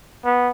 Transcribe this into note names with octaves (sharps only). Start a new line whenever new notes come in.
B3